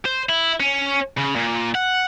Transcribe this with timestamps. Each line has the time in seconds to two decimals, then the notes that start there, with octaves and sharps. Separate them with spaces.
0.05 C5
0.29 E4
0.60 C#4
1.17 C#3
1.35 A#2
1.75 F#5